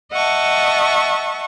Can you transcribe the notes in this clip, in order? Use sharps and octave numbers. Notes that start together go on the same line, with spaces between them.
D#5 E5 F#5 A5 C#6